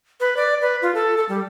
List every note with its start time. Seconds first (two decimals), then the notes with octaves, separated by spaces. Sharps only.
0.20 B4
0.37 D5
0.61 B4
0.82 F4
0.95 A4
1.17 A4
1.29 G3